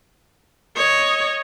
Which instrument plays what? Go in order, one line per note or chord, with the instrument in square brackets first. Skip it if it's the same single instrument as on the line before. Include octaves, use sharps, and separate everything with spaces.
[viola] C#5 D#5